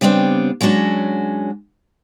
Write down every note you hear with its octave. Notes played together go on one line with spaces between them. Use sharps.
C#3 G3 B3 C4 D4
F#3 G#3 C#4 D4 F#4